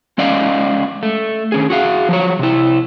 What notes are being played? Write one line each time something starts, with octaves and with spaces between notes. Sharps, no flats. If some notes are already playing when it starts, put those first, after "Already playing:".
G#3 C#4 D5 D#5 F5
A3
D#3 C#4 G#4
F#4 G#4 F5
F3 F#3 C#5
C3 E4